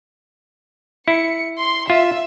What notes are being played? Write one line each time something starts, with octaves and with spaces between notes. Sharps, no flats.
E4 C#7
C6
F4 E5